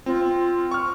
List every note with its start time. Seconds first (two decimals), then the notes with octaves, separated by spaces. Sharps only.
0.06 C4 F4
0.71 C#6 F6